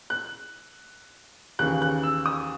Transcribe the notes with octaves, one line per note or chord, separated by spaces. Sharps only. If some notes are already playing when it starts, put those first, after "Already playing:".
F#6
D#2 C#3 E3 F#6
F#6
E6
D#6